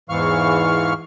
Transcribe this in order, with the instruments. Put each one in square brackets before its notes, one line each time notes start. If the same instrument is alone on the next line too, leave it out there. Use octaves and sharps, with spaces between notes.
[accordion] E2 G#2 E3 F5 C#6 F6